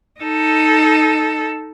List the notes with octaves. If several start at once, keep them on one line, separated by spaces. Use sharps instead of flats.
D#4 A4